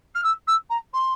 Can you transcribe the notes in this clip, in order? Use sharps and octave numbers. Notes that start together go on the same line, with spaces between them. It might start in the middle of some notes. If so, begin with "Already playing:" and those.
F6
E6
E6
A#5
C6